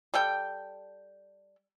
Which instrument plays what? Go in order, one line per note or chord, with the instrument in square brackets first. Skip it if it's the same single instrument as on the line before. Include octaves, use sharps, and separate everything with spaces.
[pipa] G3 A4 G5